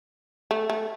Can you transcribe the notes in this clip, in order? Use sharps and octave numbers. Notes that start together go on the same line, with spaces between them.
A3
A3